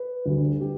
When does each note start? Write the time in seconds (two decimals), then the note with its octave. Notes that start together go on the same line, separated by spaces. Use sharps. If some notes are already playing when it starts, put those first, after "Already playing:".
Already playing: B4
0.26 D2 D3 G3
0.61 G4